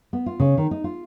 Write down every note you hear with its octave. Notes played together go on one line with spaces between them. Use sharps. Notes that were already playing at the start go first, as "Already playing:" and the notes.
B3
F4
C#3
D#3
D#4
F4